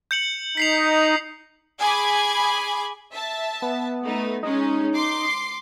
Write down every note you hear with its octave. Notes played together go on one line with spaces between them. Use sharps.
G6 C#7 F#7
D#4 B6 C7 F7
G#4 G#5 B5 D6
E5 A5
B3
A3 D#4
G#3 C#4 D#4
C6 D6 C7